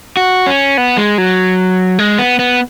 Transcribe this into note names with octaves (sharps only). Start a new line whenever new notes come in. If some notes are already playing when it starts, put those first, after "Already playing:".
F#4
C#4
B3
G#3
F#3
G#3
B3
B3